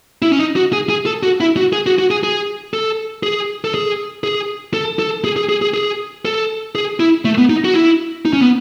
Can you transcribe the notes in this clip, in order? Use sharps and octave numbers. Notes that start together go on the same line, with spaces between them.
E4
C#4
D#4
F#4
G#4
G#4
A4
F#4
E4
F#4
G#4
F#4
F#4
G#4
G#4
A4
G#4
A4
G#4
G#4
A4
A4
G#4
G#4
G#4
G#4
G#4
A4
G#4
E4
A3
B3
D#4
F#4
E4
D#4
C#4
B3